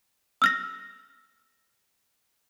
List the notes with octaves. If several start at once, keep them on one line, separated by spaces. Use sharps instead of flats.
E6 F6 A#6